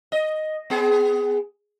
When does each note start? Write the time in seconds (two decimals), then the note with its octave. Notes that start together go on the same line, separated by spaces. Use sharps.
0.12 D#5
0.70 B3 G#4